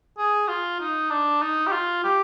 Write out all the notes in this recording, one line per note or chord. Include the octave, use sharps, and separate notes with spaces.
G#4
F4
D#4
D4
D#4
G4
F4
G4